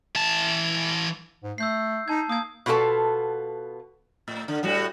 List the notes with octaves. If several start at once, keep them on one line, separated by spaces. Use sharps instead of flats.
E3 A5
G#2
A3 E6 G6 C7
D#4 A5 G#6
A#3 D#6 G#6
B2 B3 F4 A4 A5
A2
D3
A2 G3 F#4